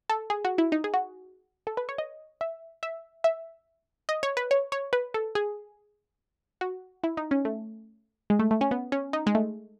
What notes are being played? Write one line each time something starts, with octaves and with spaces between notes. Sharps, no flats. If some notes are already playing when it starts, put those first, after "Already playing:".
A4
G#4
F#4
E4
D#4
G#4
F#4
A4
B4
C#5
D#5
E5
E5
E5
D#5
C#5
B4
C#5
C#5
B4
A4
G#4
F#4
E4
D#4
C#4
A3
G#3
A3
A3
C#4
B3
C#4
D#4
G#3
A3